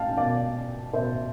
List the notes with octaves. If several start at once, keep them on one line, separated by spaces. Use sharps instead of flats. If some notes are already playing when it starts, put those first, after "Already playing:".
Already playing: F5 G5 A5
B2 D5 F5
B2 C5 E5